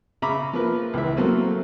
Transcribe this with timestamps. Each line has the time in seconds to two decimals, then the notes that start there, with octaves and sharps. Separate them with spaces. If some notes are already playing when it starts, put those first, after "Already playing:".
0.22 C#3 E5 A#5 B5 D6
0.53 F3 A#3 A#4 B4
0.94 C#2 E3 E5
1.17 F#3 A3 A#3 C4